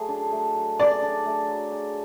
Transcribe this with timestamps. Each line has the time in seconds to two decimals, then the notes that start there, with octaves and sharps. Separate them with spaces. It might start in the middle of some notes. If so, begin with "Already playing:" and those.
Already playing: F#3 A3 G#4
0.09 D4
0.32 A3
0.56 F#3
0.79 G#4 D5
1.02 D4
1.25 A3
1.49 F#3
1.72 G#4